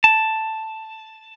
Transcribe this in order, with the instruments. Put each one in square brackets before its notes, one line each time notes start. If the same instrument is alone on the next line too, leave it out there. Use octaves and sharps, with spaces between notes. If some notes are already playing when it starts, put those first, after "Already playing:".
[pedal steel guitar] A5